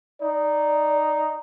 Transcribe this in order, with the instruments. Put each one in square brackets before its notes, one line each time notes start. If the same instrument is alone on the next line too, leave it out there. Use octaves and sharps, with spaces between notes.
[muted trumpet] D#4 [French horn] D5